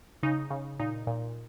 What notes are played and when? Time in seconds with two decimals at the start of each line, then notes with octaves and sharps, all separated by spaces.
0.23 C#3 D#4
0.51 C#3
0.79 A#2 D#4
1.07 A#2